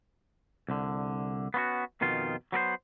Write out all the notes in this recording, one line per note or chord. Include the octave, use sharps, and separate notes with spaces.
C2 D3
B3 C#4 F4 F#4
F2 B2 D#3 F4
F#3 B3 A#4 C5